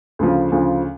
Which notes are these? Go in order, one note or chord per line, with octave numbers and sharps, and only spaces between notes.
D2 C#3 F3
D2 C#3 F3